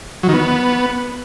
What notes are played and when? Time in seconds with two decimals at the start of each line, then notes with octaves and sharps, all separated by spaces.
0.23 F#3
0.28 D#3
0.34 B3